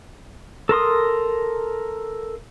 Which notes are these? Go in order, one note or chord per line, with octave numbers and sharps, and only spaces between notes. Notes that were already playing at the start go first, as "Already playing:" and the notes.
A4 A#4 C6 D#6